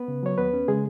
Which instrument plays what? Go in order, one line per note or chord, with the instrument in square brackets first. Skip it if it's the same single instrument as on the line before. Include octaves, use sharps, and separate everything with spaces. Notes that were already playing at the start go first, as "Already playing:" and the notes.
Already playing: [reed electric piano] B3 B4
C#3
F#3 C#5
D#2 B3 B4
C#4
C#3 G#3 G#4